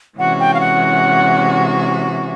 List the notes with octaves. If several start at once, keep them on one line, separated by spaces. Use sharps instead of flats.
C3 E3 G#3 C#4 F#4 F#5
G5
F5
F#5